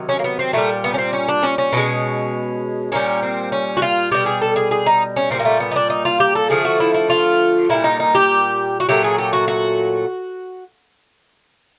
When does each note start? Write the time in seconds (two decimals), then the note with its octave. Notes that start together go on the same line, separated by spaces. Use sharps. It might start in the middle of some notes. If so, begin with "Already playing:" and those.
Already playing: C3 D#3 F#3
0.09 C#4
0.19 A#3
0.24 B3
0.39 C4
0.53 A#2 G3 A3
0.84 B3
0.94 C#4
0.98 C4
1.13 C#4
1.28 D4
1.43 C#4
1.58 C#4
1.73 B2 G#3
2.92 A#2 G3 C#4
3.23 C4
3.52 C#4
3.77 F#4
3.82 F4
4.11 B2 G3 G4
4.26 G#4
4.41 A4
4.56 G#4
4.71 G#4
4.86 D#4
5.16 C#4
5.30 A#2 G3 C4
5.40 A#3
5.45 A3
5.60 B3
5.71 D#4
5.76 D4
5.90 D#4
6.05 F4
6.20 G4
6.35 A4
6.50 D3 F3 A3 G#4
6.65 F#4
6.80 E4
6.94 E4
7.10 F4
7.69 A#2 G3 E4
7.84 D#4
8.00 D#4
8.15 G4
8.80 F#4
8.89 A#2 F#3 A3 G4
9.04 G#4
9.18 G4
9.33 F#4
9.48 F#4